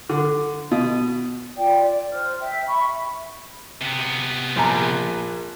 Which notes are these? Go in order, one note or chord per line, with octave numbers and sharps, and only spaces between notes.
D3
B2
F4 D5 G5
D5
C5 F6
E5 G5
E5 B5 C#6
C3 B3
A#1 G#5 A#5